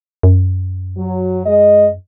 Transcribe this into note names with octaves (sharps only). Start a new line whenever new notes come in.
F#2
F#3
G#3 D#5